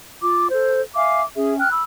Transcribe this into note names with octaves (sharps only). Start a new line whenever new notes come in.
F4 D6
A4 C5
E5 F5 G#5 D6
C#4 G#4 E5
G5 F6 F#6
B5 E6